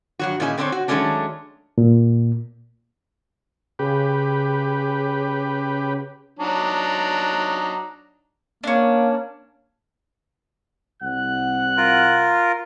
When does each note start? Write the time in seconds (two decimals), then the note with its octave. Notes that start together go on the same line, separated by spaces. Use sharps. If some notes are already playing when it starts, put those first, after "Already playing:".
0.19 G2 F#3 F#4
0.40 A#2 C#4 E4 G#4 D#5 G#5
0.58 D3 C4 D4 C5 C#5
0.72 F#4
0.88 D#3 F#3 G#3 A3 C#4 D4
1.78 A#2
3.79 C#3 G4 B4
6.39 F#3 D4 D#4
8.64 A#3 C#4 D4
11.02 C2 F#5 F#6
11.77 F4 A#4